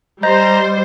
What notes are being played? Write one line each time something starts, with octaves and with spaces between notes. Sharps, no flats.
G3 C5 D#5 A#5 G6